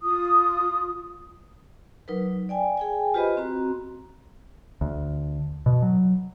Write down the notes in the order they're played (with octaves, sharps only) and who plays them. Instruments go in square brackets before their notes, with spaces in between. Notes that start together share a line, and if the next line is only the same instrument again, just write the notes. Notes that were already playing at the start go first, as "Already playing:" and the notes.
[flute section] F4 D#6
[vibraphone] F#3 D#4 A#4 B4
D5 G5 G#5
G#4 G5 G#5
F4 G4 B4 C5 D#5 B5
C4 F#4 A#5
[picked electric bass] D2
B2
F#3